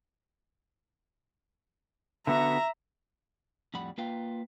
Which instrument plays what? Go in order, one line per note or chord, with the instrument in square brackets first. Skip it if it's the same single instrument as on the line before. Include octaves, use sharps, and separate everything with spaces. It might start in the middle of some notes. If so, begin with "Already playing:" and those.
[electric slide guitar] D3 B3 F#4 [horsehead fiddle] E5 [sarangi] A#5
[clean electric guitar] F2 A2 G3 F#5 B5
A#3 F4 B4 F5 G5